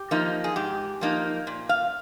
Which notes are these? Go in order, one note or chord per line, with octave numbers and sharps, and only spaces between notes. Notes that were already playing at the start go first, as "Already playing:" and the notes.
Already playing: G4
F3 A#3 D#4
G#4
G#2 G4
F3 A#3 D#4
A#2
F5